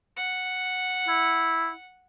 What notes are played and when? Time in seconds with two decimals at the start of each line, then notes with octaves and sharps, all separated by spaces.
0.17 F#5
1.08 E4